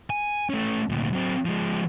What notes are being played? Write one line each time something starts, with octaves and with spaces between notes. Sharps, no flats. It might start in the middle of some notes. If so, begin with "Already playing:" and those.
G#5
A3 C#4
D2 A#2
F#3 C4
F3 G#3